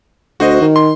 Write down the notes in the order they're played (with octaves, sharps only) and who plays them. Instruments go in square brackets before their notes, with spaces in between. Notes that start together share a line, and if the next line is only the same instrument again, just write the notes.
[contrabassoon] D2 [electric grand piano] F#4 C5 D#5
[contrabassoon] D#3
[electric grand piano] C6